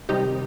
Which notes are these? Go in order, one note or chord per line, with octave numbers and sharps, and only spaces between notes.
C3 D#3 G3 D#4 G4